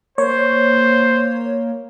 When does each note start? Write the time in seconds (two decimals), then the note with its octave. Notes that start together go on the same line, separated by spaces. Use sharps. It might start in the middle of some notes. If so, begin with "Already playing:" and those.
0.18 A#3 C5 C#5